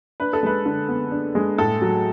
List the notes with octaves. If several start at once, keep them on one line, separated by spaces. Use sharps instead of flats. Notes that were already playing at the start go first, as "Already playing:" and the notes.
D4 B4
A4
G#3 B4
D3
B3
D4
G#3
A2 A4
F#3